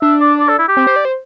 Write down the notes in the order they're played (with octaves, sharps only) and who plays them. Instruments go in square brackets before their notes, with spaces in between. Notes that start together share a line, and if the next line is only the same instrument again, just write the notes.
[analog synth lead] D4 [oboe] E5
[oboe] D5
D5
A4
E4
G4
[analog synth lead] C4
C5
D5
C5